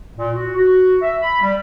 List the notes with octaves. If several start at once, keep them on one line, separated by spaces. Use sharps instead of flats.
A#2
F#4
F#4
E5
B5
G3